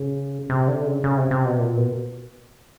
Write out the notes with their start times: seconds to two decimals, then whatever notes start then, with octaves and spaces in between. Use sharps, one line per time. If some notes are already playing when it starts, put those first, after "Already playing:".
Already playing: C#3
0.50 C3
0.68 D3
0.86 C#3
1.04 C#3
1.17 C3
1.31 C3
1.45 B2
1.59 A#2
1.76 B2